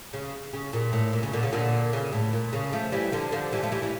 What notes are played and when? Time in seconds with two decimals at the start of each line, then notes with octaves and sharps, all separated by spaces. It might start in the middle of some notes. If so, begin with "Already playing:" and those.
0.13 C#3
0.53 C#3
0.73 A#2
0.93 A2
1.13 A#2
1.23 C#3
1.33 A#2 D3
1.43 C#3
1.53 A#2 D3
1.93 C#3
2.13 A2
2.33 A#2
2.53 C#3
2.73 F3 A3
2.92 E3 G3
3.12 D3 F3
3.32 D3 F3
3.53 E3 G3
3.63 F3 A3
3.72 E3 G3
3.82 E3 G3